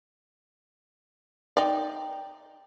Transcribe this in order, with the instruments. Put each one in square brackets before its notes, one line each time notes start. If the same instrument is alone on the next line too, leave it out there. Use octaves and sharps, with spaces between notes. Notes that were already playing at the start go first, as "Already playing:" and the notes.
[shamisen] D#4 D5 [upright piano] G5